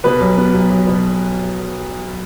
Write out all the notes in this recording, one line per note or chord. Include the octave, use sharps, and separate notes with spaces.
B2 B4
B1
B3
B1
B1
B2